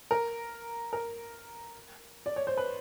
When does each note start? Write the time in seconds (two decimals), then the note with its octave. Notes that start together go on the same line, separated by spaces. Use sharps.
0.11 A#4
0.93 A#4
2.26 D5
2.36 C#5
2.47 C5
2.57 B4